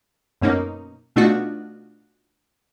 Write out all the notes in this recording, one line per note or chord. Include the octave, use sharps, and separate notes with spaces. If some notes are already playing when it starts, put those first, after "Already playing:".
F#2 B2 A#3 C#4 D#4
B2 A3 D4 D#4 F4 F#4